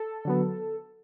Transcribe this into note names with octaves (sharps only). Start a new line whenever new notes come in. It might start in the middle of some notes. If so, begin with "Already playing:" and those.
Already playing: A4
D3 F#3 B3